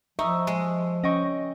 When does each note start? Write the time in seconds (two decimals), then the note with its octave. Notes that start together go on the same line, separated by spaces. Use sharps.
0.19 F3 D#4 E5 C#6 D#6
0.47 G#3
1.03 C#4 D#5 G5 C#6